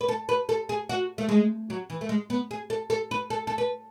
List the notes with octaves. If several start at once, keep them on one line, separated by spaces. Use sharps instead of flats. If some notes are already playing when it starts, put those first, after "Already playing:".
B4
A4
B4
A4
G#4
F#4
A3
G#3
F#3
E3
A3
G#3
B3
G#4
A4
A4
B4
A4
A4
B4